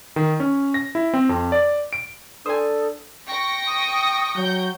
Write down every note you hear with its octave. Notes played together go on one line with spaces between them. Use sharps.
D#3
C#4
A#6
E4
C4
F2
D5
D7
D4 A4 C5 G#5 D#6
G5 C#6 A#6
D#6
F#3 G6